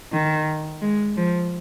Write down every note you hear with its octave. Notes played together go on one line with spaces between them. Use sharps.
D#3
G#3
F3